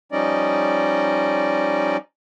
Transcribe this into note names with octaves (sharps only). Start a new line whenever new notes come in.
F3 G3 C#4 D#4 D5 D#5